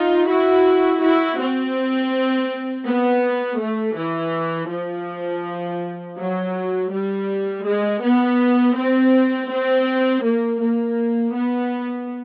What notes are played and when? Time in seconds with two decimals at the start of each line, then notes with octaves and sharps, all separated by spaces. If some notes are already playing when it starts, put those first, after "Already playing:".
Already playing: D#4 F4
0.28 E4 F#4
1.01 E4 F#4
1.39 C4
2.86 B3
3.60 A3
3.97 E3
4.70 F3
6.18 F#3
6.92 G3
7.66 G#3
8.02 B3
8.77 C4
9.50 C4
10.24 A#3
10.61 A#3
11.34 B3